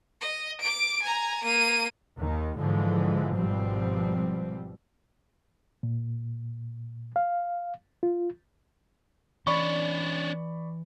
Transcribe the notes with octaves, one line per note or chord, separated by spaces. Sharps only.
D#5
D6 D7
G#5 A#5
A#3 D#7
D#2 D#3
G#2 D3 E3 F3 G#3
G#1 B2 F3 G3 C4
A#2
F5
F4
E3 C#4 D4 D5 B5 C#6